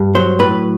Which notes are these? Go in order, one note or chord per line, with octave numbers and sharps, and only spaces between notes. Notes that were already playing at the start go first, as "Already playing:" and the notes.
Already playing: G2
F#3 C5
A2 B4